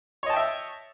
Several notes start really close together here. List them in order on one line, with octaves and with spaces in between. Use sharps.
C#5 D#5 A5 G5 E5